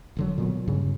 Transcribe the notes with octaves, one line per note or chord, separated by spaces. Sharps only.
E1 D3 F#3
A#2 F#3 B3
G2 C#3